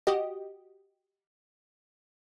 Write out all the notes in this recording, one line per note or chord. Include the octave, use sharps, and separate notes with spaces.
F#4 G4 D#5